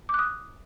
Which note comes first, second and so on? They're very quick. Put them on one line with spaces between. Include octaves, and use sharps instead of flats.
D6 F#6 D#6